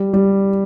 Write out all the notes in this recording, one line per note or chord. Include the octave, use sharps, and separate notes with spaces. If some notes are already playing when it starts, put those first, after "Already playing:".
Already playing: G3
G3